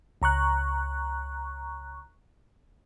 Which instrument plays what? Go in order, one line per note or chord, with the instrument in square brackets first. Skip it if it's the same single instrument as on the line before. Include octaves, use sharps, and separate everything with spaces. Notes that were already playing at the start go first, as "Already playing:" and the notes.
[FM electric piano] C#2 A#5 C#6 F#6